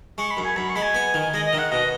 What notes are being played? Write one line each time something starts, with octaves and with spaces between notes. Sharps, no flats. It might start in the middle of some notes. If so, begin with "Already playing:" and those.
G#3 C#6
B5
F#2
G#5
F#2 B5
C#6
G#3 B5
G#5
B3
D#3
G#3 D#5
D#5
D#3
F#5
B2 D#5